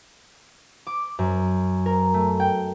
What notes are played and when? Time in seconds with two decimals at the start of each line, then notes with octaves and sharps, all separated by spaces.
0.87 D6
1.19 F#2
1.86 A#4
2.14 A3
2.40 G5